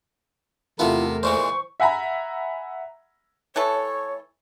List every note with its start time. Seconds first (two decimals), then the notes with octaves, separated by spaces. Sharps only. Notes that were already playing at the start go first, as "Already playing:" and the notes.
0.79 E2 C3 A3 B3 E4 F4 A4 A#4
1.23 A#2 E3 G#3 C5 C#6
1.80 E5 F#5 G#5 A#5 B5
3.56 E3 A3 A4 C#5